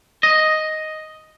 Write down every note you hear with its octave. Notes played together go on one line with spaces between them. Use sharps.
D#5